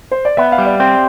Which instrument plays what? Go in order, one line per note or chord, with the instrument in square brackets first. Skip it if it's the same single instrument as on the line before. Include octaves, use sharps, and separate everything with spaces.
[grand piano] C5
D5
[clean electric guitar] B3 [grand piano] E5
[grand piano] F5
[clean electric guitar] G3
[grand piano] D5
[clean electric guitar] C4 [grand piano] G4